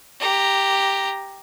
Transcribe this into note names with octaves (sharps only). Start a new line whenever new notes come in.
G4 A#5